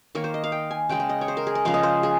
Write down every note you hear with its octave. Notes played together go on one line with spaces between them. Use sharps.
D#3 A#3 C#5
C5
D#5
F5
G5
G#5
C#3 G#3 G5
G5
D#5
C#5
C5
A#4
G#4
D#5
C#3 F3 G#3 F5
D#5
C5
G#4